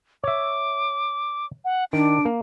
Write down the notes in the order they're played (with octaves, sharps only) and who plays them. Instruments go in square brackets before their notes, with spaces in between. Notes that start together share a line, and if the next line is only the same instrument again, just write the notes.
[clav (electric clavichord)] C#5 E5 [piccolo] D6
[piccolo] F#5
[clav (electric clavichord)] D#3 [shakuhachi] D4 [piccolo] D7
[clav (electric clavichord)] A#3